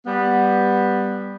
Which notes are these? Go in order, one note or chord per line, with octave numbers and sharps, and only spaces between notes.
G3 B3